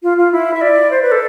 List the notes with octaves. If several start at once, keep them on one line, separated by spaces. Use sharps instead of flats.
F4
F4
E4
E5
D5
C5
B4
A4